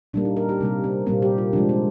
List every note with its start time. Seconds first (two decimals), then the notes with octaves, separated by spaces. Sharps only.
0.14 A#2 G3 A#3 D4
0.25 D#4
0.37 A#4
0.49 G4
0.61 C3 G3 A#3
0.84 C4
1.06 A#2 G3 A#3 C4
1.22 G4
1.38 F4
1.53 C3 F3 G#3 D4
1.69 C4